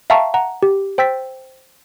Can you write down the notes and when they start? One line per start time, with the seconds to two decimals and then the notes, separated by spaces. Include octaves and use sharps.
0.10 E5 F5 G5 A5 A#5 C#6
0.34 F#5 A#5
0.63 G4
0.98 C5 G5 E6 A6 B6